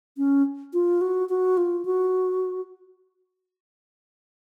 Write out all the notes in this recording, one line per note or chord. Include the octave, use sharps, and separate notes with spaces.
C#4
F4
F#4
F#4
F4
F#4